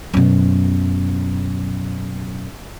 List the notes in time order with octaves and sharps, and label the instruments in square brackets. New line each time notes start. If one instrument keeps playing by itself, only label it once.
[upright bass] F#2 B2